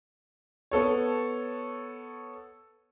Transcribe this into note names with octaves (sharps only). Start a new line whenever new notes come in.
B3 A4 C#5